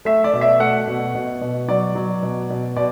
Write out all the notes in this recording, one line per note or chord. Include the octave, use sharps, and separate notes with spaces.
A3 E5
D5
B2
E5
A3 F#5
B2
B2
B2
F#3 D5
F#3
B2
B2
B2 D5